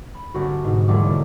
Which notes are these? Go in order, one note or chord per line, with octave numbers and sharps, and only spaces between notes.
B5
G1 C4 F#4
G#2 B2
E1 D#2 G3 A3 F#5 D6
D3 F#3 A#3